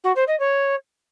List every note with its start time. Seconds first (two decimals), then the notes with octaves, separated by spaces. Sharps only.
0.04 F#4
0.16 C5
0.27 D#5
0.39 C#5